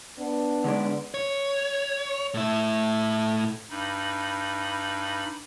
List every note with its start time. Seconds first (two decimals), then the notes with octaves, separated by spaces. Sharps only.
0.19 B3 D4
0.64 D3 G#3 D5
1.14 C#5
2.34 A2 E4
3.70 G2 D#4 B5